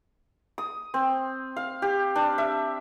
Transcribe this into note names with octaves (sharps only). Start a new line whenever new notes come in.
D#6
C4
F5
G4
D4
E5